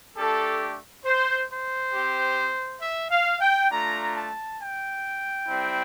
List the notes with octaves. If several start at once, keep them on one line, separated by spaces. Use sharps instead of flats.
A3 D4 G4 A4
C5
C5
C4 G4
E5
F5
G5
A3 D4 F4 A#5
A5
G5
G3 C4 E4